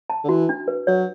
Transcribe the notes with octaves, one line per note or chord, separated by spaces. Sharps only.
A5
D3
E3 F#4
D4
B4
F#3 C#5